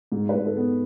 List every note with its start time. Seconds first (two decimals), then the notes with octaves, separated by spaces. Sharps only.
0.12 G#2
0.29 B4
0.34 G#2
0.46 A4
0.57 B3